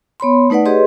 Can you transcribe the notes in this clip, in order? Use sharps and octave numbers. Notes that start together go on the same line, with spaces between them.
B3 C#5 B5 C6
A3 D#4 B4 D5 F#5
G4 G#4 B4 C#5 D#5 C6